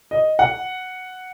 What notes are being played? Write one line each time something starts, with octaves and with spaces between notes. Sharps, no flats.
D#5
F#5